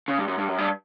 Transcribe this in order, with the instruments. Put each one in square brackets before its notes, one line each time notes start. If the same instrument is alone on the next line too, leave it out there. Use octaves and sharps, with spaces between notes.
[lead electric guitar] C#3
G2
F#2
G2
F#2
G2